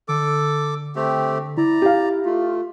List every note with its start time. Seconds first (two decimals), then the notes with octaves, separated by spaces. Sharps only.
0.08 D3 A4 D6
0.96 A3 C4 G4
1.57 E4 D5 A#5
1.82 G4 F5
2.25 A3 F4